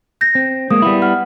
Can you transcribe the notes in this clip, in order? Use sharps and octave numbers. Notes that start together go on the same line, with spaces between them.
G6 A#6
C4
G#3 A#3 D#6
G3 B3 E4
F#5 F6